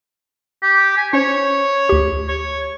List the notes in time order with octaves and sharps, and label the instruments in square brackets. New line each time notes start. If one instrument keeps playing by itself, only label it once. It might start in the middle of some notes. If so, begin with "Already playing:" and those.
[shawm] G4
G#5
[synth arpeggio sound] C#4 C5 [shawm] C#5
[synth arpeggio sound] D2 G4
[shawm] C#5